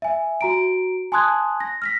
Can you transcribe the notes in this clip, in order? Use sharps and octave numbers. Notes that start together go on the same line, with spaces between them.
E5 G#5
F#4 A#5 D7
G#5 A5 C6 D#6 F#6 G#6
A#6
F6 A#6 B6